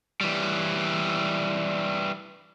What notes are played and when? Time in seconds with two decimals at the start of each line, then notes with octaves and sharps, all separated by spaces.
0.21 E3 G3